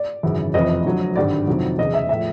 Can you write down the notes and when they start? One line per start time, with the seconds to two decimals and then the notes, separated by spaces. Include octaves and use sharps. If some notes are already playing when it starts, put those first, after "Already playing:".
Already playing: D5
0.23 G#1 F#2 C#3 E3
0.54 F1 F2 C3 E3 D#5
0.85 F2 D3 F#3
1.16 G#1 G2 D3 G3 D5
1.47 F2 C3 D#3 F#3
1.78 F1 E2 C#3 D#5
1.94 E5
2.09 A2 F3 E5